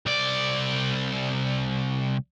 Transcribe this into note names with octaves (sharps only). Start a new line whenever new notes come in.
C2 D5